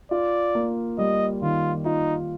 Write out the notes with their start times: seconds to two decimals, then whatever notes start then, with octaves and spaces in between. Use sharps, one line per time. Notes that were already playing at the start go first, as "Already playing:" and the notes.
0.11 F4 D5
0.55 A#3
0.98 G3 D#5
1.42 D#3 F4
1.85 D#4 F4